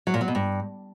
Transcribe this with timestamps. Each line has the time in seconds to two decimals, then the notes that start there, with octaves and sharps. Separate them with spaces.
0.07 F#3
0.14 A#2
0.21 F#3
0.28 B2
0.35 G2